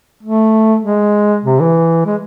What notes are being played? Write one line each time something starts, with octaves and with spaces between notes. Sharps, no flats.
A3
G#3
C3
E3
G#3